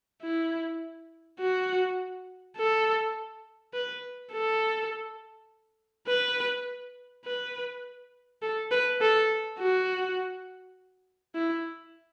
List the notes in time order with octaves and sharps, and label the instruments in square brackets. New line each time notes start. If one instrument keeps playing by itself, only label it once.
[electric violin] E4
F#4
A4
B4
A4
B4
B4
A4
B4
A4
F#4
E4